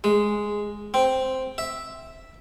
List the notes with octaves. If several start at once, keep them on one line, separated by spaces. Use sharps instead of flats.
G#3
C4
E5